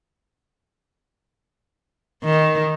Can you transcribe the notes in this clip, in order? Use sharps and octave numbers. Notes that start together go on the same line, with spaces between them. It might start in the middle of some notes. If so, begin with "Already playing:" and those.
D#3